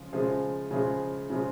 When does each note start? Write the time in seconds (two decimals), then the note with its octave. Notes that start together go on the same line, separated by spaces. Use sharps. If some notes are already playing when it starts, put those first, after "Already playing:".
Already playing: C#3 F3 G#3
0.13 C#3 F3 G#3
0.71 C#3 F3 G#3
1.30 C#3 F3 G#3